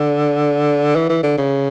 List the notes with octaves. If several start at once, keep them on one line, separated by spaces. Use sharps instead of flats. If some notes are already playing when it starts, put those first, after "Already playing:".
Already playing: D3
E3
E3
D3
C#3